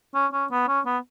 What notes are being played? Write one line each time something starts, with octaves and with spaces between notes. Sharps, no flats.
C#4
C#4
B3
C#4
B3